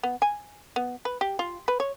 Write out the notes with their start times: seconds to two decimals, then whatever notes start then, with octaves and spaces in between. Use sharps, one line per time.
0.03 B3
0.22 G#5
0.76 B3
1.05 B4
1.21 G4
1.39 F4
1.68 B4
1.80 C#5